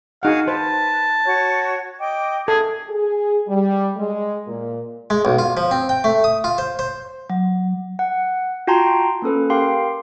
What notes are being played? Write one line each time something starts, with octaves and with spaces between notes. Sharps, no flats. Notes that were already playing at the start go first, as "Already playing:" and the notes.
D#4 F#4 G#4 F5 F#5
B4 C5 A5
F#4 C#5
D#5 G5 D6
G#4 A4
G#4
G3
G#3
A#2
G#3
B1
F4
F3
C4
G5
A3
D#6
F4
C5
C5
F#3
F#5
F4 F#4 G5 A5 A#5 C6
A#3 C#4 A4 B4
G4 A#4 F5 G5 C6